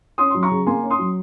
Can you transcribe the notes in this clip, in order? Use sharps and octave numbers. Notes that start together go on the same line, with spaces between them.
C#4 C6 D#6
F#3 C6
A#5 C#6
C#3
A#3 G#5 C6
C#4
C6 D#6
F#3